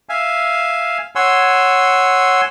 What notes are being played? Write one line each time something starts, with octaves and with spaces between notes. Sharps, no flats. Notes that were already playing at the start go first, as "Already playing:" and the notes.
E5 F5 G#5
C#5 F#5 G#5 C6 E6